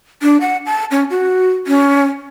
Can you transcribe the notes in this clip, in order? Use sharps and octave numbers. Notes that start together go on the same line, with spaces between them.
D4
F#5
A5
C#4
F#4
C#4